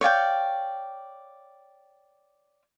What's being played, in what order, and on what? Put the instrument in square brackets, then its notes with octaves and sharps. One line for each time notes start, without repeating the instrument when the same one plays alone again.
[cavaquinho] C#5 D5 F5 G5